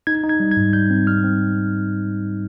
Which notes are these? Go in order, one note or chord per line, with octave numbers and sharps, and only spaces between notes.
D#4 G#6
D#4
G#6
G3
G#6
G#2
G3 G6
C4
G3 F6
C4